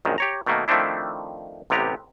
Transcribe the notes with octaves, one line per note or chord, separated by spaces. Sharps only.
A#1 F#2 D#3
G4 C#5 A#5
B2 D#3 A3 A#3
D#3 F3 A3 C4 D4 E4
A1 C3 B3 G4 A#5